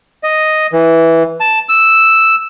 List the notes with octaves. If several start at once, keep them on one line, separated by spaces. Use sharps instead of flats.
D#5
E3
A5
E6